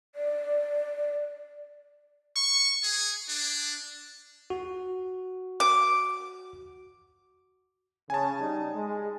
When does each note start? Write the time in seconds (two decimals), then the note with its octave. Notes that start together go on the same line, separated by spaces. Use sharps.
0.15 D5
2.36 C#6
2.83 G#4
3.29 D4
4.50 F#4
5.60 D6
8.10 C#3 G#5 A5
8.40 G3 D#4
8.74 G#3